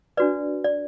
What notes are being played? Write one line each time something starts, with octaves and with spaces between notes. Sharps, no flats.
D4 F#4 B4 D5
D5